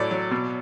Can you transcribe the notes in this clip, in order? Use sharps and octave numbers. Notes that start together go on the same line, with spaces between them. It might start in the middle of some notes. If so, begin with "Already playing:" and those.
Already playing: A2 F#3 D5
F#3
B2